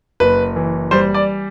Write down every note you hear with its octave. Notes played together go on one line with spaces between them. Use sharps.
F#1 B4
E3
G3 C5
D5